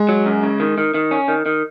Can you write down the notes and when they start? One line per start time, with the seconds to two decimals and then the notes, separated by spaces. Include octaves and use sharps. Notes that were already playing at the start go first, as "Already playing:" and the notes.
Already playing: G#3
0.09 F#3
0.26 F#2
0.43 C#3
0.60 D#3
0.78 D#3
0.94 D#3
1.11 C#4
1.28 D#3
1.46 D#3